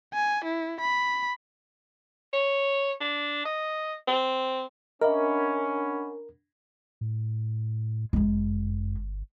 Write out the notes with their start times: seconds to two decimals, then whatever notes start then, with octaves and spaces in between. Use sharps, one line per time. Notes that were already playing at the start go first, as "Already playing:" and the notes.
0.13 G#5
0.45 E4
0.81 B5
2.33 C#5
3.00 D4
3.45 D#5
4.08 C4
5.01 C#4 D4 A#4 D#5 E5 F#5 B5
7.01 A2
8.13 G1 F#2 G#3